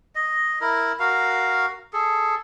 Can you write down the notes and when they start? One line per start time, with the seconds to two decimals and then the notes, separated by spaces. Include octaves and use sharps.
0.15 D#5
0.61 E4 A#4
1.00 F#4 A#4 F5
1.93 G#4 A4